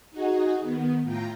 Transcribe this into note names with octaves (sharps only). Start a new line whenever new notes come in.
D#4 F#4 G#4
D#3 B3
A2 F4 G5 A#5